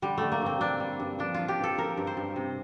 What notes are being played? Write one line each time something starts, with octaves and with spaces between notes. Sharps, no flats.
D3 G3
D3 A3
A#3
G2 C4
G2 D4
G3
G2
F3 D4
F3 F4
G4
G2
A4
F3 A#4
G2
C5
G2
C3